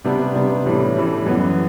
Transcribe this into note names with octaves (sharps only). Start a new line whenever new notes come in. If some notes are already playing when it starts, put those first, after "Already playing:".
C3 G3 B3 D4
C3 G3 B3 D4
A2 E3 G3
A2 E3 G3
F#2 E3 B3